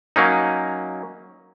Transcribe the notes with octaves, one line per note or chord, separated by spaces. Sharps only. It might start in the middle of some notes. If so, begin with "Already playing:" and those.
F#3 A#3 C#4 D#4